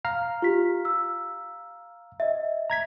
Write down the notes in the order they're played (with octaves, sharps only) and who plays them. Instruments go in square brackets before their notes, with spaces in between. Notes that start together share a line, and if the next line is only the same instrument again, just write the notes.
[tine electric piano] F5 A#5 F6
[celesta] F4 G4 B6
E6
D#5 E5
[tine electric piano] A#5 G#6 B6